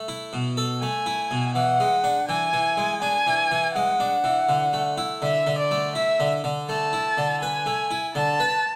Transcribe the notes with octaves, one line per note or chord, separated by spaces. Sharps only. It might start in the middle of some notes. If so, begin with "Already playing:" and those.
Already playing: A3
E4
B2
A4
A3 G#5
E4
B2
E3 F#5
G#3
D4
E3 G#5
E3
G#3
D4 G#5
E3
E3
G#3 F#5
D4
E3
D3
A3
E4
D3 E5
D3
D5
A3
E4 E5
D3
D3
A3 A5
E4
D3
B4 G#5
A3
E4
D3 A5
B4